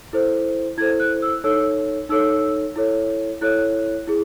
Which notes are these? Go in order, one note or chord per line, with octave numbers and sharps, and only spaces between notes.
E4 A4 C5
E4 A4 C5 G#6
F#6
E6
D#4 A4 C#5 E6
D#4 A4 C#5 E6
E4 A4 C#5
E4 A4 C#5 F#6
E4 G#4